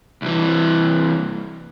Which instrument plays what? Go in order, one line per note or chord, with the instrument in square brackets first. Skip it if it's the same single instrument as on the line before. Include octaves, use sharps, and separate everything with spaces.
[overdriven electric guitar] C2 E3